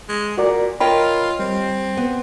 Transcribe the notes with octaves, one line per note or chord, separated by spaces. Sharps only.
G#3
A#2 F#4 A#4 D5
F4 A#4 C#5 D#5 G5 B5
G3 C4
B3